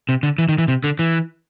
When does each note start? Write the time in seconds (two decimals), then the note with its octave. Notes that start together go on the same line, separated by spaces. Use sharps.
0.09 C3
0.23 D3
0.38 E3
0.49 D#3
0.58 E3
0.68 C3
0.84 D3
0.99 E3